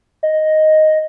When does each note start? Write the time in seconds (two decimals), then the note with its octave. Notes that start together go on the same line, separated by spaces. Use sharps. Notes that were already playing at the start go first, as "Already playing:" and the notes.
0.23 D#5